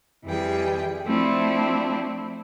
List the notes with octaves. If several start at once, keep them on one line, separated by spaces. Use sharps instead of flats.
F2 E3 G3 G#4 G5
F3 A3 C4 D4 E4